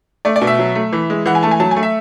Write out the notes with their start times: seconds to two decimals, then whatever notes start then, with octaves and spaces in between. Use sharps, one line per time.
0.25 A3 D5
0.36 D5
0.41 B2
0.47 E5
0.59 F#3
0.75 A3
0.93 E3
1.10 G#3
1.26 E3 F#5
1.35 G#5
1.43 A3 A5
1.51 G#5
1.60 F#3 A5
1.71 G#5
1.76 A3
1.83 E5